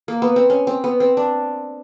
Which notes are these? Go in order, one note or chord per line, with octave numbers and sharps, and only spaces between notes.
A#3
B3
C4
C#4
C4
B3
C4
D4